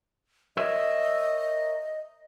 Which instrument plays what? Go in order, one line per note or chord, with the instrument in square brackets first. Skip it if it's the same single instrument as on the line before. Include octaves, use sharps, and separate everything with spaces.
[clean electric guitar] A#4 C#5 E5 [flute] D#5